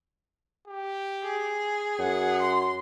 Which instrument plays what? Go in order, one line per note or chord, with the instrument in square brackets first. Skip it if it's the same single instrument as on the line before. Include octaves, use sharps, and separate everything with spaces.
[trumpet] G4
[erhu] G#4
[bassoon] F#2 [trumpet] F#5
[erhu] C6